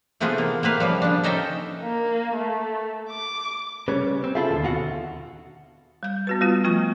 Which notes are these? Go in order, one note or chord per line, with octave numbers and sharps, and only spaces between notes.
C3 E3 A3 B3 F4 G#4
A#3
A#3 C4 B4 F5
C#3 F3 G3
F3 D4
C#4 D#4 A4 E5 G5
A#3
A3
D6
C#3 G3 C#4 B4
C4
E4 F4 G#4 A4 E5
D#2 G#2 D3
B2 F4 F#4
G3 G6
B3 F#4 B4
G3 B3 F4
F3 A3 F4 C#6